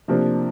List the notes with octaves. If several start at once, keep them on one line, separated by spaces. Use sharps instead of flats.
C3 F3 A#3 D4